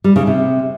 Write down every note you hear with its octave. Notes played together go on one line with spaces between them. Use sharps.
G3
C#3
C3